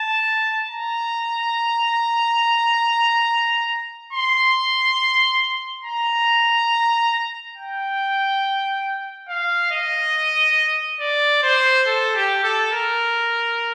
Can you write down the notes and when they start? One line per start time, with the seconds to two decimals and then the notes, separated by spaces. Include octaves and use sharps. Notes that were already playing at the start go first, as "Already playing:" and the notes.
Already playing: A5
0.68 A#5
4.13 C6
5.84 A#5
7.56 G5
9.28 F5
9.71 D#5
11.00 D5
11.43 C5
11.87 A4
12.15 G4
12.43 A4
12.72 A#4